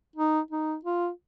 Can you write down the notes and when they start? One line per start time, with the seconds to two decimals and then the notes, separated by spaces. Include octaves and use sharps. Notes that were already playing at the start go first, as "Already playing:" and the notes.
0.16 D#4
0.51 D#4
0.85 F4